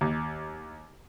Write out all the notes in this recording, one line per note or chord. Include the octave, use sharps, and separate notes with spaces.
D#2